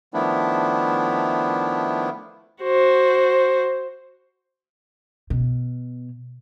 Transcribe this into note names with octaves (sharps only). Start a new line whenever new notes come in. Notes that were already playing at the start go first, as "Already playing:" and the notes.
D#3 F3 A3 B3 D4 E4
F#4 C5
B2